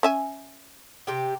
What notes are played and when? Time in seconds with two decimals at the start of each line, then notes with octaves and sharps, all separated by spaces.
0.03 C#4 E5 G#5
1.07 C3 G4